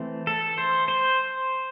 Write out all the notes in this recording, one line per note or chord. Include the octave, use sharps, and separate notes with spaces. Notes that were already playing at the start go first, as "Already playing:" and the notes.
Already playing: E3 A3 C4
A4
C5
C5